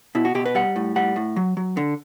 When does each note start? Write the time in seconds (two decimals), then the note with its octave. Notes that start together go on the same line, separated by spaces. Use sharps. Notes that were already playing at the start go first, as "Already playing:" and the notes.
0.15 B2 E4
0.25 F#4
0.35 B2 G4
0.46 B4
0.55 G3 F#5
0.76 A2
0.96 G3 F#5
1.16 A2
1.36 F#3
1.57 F#3
1.77 D3